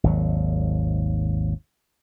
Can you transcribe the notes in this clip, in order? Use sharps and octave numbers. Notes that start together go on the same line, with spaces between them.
G#1 D#2 F#3